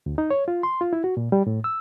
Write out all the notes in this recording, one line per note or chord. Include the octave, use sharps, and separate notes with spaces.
D2
D#4
C#5
F4
C6
F4
E4
F#4
A#2
G3
A2
E6